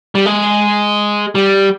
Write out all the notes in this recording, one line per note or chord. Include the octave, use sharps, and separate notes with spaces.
G3
G#3
G3